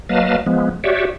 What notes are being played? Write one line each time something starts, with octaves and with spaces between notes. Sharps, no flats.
F#3 A#3 B4 D#5 F5 A5
F3 G#3 B3
F#4 G4 C#5 D5 E5